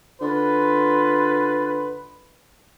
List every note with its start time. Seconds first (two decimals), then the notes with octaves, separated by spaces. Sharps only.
0.21 D3 F4 B4